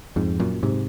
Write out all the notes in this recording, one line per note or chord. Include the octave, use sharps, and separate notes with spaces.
F2 G#2
F#2 A#2
G#2 C3